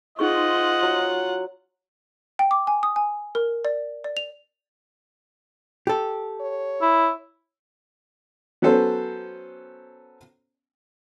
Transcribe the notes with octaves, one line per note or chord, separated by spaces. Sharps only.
D#4 F4 G#4 C5 D#5 F#5 C#6
F#3
G5
D6
G#5
D#6
G#5
A#4
D5
D5
F7
G4 A4
C#5
E4
F#3 B3 C#4 A4 C5